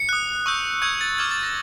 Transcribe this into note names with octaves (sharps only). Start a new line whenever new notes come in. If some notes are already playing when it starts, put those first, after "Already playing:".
Already playing: C#7
D#6 F#6
C#6 E6 G6
C#6 E6 G6 G#6
A6
D6 F6 G#6
A6
A#6